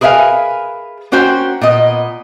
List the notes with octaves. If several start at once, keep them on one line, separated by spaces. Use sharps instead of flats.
G#4 A#4 B4 E5 F5 G#5
A#3 C#4 F#4 C5 G5
A#2 B3 D#5